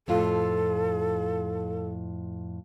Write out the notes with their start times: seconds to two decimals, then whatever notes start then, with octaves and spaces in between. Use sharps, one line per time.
0.08 F2 A2 F4 A4